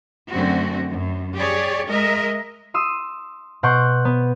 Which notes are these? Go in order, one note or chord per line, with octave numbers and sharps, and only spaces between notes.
F#2 D3 A3 C4 F#4
F#2
G4 G#4 C#5 D5
G#3 A#4 D#5 E5
C6 D#6 E6
B2 F#5 C6 C#6 G6 D7
B3